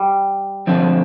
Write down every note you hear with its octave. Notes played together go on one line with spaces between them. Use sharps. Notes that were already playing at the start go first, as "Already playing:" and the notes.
Already playing: G3
D3 F3 C4 D#4